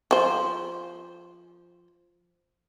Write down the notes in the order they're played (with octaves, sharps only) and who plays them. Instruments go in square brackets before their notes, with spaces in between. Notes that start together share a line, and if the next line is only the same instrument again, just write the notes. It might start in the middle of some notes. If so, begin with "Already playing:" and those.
[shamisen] F3 C5